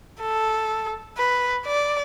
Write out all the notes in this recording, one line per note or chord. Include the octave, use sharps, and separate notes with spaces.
A4
B4
D5